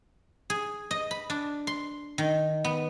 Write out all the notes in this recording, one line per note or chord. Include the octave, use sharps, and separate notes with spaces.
G#4
D#5
B5
D4
C6
D#3
B3